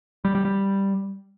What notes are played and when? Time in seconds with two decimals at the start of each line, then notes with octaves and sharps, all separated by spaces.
0.25 G3
0.35 G3
0.45 G3